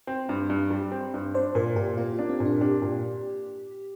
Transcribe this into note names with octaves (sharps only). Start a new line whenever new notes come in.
C4
G2
G2
G3
C4
G2
D4 C5
A#2 A#4
A#2 G4
A#3 F4
F4
D4
C4
A#2
D4
D4 G4
A#2